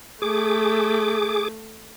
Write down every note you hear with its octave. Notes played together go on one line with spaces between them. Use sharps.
A3 G#4 D6